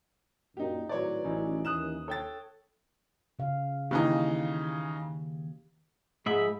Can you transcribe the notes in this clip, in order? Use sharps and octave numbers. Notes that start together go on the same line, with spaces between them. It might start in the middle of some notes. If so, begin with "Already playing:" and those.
F#2 A#2 D#4 G4
G#1 A2 F#3 B4 C#5 D5
A1 E3 C#4 D#4
D#2 D#6 F#6 E7
A4 C#5 G5 A6
C#3 F5
D#2 C#3 E3 D#4 G4
G#2 F3 G#4 E5 B5